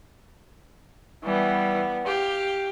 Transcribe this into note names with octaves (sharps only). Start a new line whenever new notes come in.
E3 G3 B3
G4 F5